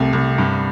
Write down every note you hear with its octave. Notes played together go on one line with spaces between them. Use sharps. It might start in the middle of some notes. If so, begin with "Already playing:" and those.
Already playing: C2 C3 A3
C2
G2